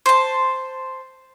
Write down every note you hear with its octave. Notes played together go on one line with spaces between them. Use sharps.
C5 A5